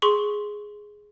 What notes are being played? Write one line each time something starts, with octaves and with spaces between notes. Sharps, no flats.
G#4 C6 C#6